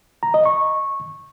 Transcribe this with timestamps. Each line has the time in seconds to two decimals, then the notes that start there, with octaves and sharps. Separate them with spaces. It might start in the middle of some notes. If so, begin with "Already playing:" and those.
0.23 A#5
0.34 D#5
0.45 C#6